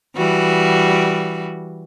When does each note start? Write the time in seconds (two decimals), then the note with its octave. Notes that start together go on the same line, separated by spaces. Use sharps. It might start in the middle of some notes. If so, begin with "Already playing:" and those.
0.16 E3 G3 F#4